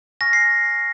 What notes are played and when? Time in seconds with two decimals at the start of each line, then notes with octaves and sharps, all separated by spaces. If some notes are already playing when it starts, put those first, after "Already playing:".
0.21 G#5 C#6 F6 A#6
0.33 C7